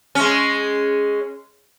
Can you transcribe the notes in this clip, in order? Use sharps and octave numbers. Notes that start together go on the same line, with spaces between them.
G#3 C#4